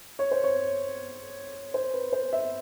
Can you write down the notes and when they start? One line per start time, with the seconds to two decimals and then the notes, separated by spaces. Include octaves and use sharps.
0.19 C#5
0.31 C5
0.44 C#5
1.74 C5
1.94 B4
2.13 C5
2.33 E5